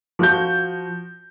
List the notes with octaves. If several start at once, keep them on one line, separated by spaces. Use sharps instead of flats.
F3 F#4 G6